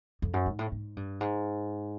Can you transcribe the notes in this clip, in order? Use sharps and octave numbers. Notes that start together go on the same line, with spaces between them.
F2
F#2
G#2
A2
G#2
G2
G#2